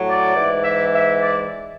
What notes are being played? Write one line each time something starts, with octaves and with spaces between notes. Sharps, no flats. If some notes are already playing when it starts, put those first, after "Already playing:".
Already playing: A2 F#3
D5
G#2 E3
E5
E5
D5